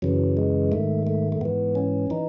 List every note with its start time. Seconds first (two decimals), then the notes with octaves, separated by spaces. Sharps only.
0.02 F#2 C#3 E3 F#3
0.37 G#3
0.72 G#2 D#3 A3
1.07 A3
1.32 A3
1.41 G#2 E3 B3
1.75 C#4
2.10 E3 D#4